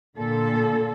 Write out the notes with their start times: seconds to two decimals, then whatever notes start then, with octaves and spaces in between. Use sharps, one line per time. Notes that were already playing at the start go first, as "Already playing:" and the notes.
0.16 A#2 D3 A4